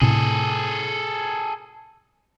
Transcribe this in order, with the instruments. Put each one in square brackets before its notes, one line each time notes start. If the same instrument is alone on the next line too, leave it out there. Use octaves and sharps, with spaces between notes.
[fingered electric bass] A2 C3 [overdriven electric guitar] G#4 A4